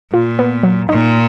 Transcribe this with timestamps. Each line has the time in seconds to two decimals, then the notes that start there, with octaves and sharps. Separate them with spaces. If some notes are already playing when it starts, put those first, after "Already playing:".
0.13 A#2 F4
0.39 B3
0.63 F#3
0.89 A#2 D#4